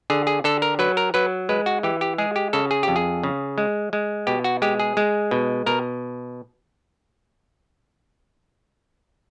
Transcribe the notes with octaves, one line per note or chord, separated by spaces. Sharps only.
D3 G#4
G#4
D3 A4
A#4
F#3 B4
A#4
F#3 B4
G#3 B4
F#4
E3 G4
G4
G#3 G#4
G4
C#3 A4
G#4
F2 G4
G#4
C#3
G#3
G#3
B2 G4
F#4
G#3 G4
G#4
G#3
B2
B2 A#4